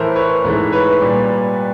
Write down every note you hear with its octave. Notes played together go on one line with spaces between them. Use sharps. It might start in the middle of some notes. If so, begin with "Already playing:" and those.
Already playing: A2 E3 A3 A#4 C5
B4 C#5
G#2 E3 A3
B4 C#5
A#2 G3